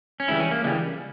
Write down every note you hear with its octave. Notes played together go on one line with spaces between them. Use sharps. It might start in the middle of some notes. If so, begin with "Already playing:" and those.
C#4
C#2 C#3 E3 G3 E4
C#4
A#3
C#2 C#3 E3 G3 G#3